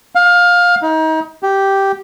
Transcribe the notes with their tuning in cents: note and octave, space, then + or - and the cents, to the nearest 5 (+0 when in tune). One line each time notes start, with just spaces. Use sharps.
F5 +20
D#4 +30
G4 -5